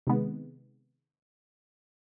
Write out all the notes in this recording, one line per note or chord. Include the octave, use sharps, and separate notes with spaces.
C3 D#3 G#3 B3